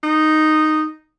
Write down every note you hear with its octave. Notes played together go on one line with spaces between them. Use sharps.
D#4